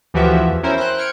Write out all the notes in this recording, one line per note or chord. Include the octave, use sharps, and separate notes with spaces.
D2 E3 F3 F#4 G4 E5
E2
C#4 E4 A#4 C5 E5
C5 G5 F#6
G5 F6 G#6 C#7 D7